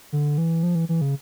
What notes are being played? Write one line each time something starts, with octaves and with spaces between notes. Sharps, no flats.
D3
E3
F3
E3
E3
C#3